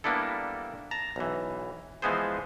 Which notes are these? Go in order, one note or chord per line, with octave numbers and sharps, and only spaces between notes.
G3 A#3 B3 D4 E4 A4
A5 A#5
B1 E3
E3 F3 G#3 B3 G#4 C5